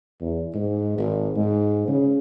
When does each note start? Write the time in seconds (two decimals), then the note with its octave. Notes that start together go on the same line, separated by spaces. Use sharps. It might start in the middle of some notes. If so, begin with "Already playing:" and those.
0.21 E2
0.54 G#2
0.98 G#1
1.36 G#2
1.88 C#3